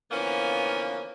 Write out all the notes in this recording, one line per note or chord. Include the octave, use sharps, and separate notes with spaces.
D3 E3 F3 A#3 B3 C#4